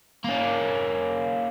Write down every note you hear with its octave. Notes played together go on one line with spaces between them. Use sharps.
A#3 C#4